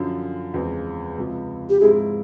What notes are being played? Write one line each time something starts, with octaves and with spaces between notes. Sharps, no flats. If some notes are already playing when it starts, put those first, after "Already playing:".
Already playing: F#2 D3 F3
E2 C#3 F3 G#3 C4
C#2 C3 F3
G4
G#2 F3 G#3 C4 E4 G#4